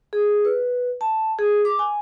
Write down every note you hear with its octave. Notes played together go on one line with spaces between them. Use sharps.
G#4
B4
A5
G#4
D6
G#5